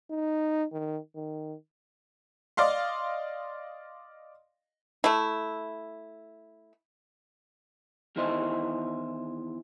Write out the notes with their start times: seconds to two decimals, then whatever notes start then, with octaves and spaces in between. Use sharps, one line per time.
0.11 D#4
0.72 D#3
1.15 D#3
2.57 D5 D#5 F5 C6
5.04 A3 E4
8.16 E2 D#3 E3 E4 C5 D#5